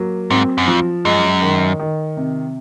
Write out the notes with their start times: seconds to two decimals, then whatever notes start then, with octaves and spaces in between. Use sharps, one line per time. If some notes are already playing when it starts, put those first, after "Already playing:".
Already playing: F#3 A#3
0.30 G#2 C4
0.58 F#2
0.68 F2 F3
1.05 F#2 G#3
1.42 D#3
1.80 D#3
2.17 C3